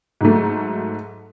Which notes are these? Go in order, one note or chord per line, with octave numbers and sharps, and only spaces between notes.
G#2 F#3 A3